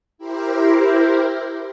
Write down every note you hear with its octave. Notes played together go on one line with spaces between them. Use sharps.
E4 G4 A#4 C5